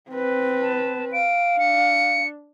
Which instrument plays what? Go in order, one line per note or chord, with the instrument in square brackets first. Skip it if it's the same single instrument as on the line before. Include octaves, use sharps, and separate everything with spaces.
[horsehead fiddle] C4 B4
[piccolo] A5
[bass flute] F5 [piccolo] D7
[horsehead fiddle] D4 [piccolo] C#7